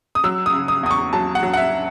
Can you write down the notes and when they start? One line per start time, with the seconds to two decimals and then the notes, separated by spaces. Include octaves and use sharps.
0.15 D#6
0.24 F#3 E6
0.46 D#6
0.53 C#3
0.68 D#6
0.83 E2 D#6
0.91 C#6
1.13 F#3 A5
1.35 F#5
1.43 F#3
1.53 F#5
1.57 E5